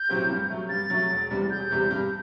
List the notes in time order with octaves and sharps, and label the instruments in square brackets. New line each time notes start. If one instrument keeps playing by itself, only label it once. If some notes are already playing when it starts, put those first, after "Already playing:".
Already playing: [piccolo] G6
[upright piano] A2 F#3 C4 G4
G2
F#3 A3
[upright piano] G2 [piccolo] A6
[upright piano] F#3 A3
E1
E2 C3 G3
[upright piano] E1 [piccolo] G6
[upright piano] E2 C3 G3
G2